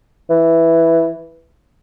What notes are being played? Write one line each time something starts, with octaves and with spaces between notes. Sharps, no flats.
E3